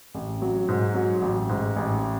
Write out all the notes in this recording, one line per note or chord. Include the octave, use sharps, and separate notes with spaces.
A1
F#3
G#2
F#3
A1
G#2
A1